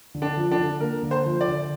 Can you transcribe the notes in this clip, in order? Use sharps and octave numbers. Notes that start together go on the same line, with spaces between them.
D3
D4
F3
D4
D3
A#3 A#4
D3
C5
F3
D5
D3